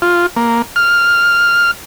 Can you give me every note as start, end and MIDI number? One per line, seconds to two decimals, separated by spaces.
0.02 0.26 65
0.37 0.62 58
0.76 1.71 89